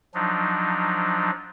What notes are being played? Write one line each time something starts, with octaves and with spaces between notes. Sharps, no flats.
F3 F#3 D4 D#4